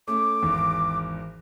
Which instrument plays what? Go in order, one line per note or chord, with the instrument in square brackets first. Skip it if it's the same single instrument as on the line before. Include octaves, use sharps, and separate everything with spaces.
[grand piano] A3 C#4 [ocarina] D6
[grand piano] G#1 E2